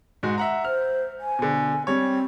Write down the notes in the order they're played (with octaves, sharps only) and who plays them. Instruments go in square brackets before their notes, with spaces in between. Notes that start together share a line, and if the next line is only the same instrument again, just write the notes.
[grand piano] G#2 G#3 F#4
E5 F#5 A#5
[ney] C5 [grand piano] F6
[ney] G#5
[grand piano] B2 D3
[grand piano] G3 C#5 [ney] C4